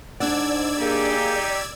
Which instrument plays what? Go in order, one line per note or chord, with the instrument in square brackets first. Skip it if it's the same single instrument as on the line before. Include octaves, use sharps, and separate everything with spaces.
[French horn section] G#2 [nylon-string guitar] D4 F#5 [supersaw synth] D5 E6 G#6
[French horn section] A#3 G#4 [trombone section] D#4 G4